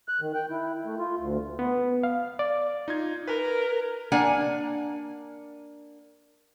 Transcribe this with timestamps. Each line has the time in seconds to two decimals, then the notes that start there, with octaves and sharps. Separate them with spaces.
0.08 F#6
0.21 D#3
0.35 G5
0.51 E4
0.85 A3
0.99 F4
1.19 D2
1.59 B3
2.03 F5
2.39 D5
2.88 D#4 F4 G#6
3.27 A#4 B4
4.12 A#3 D4 F#5 G#5